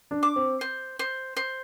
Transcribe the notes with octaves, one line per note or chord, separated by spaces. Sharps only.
D4
D6
C4
C5
C5
C5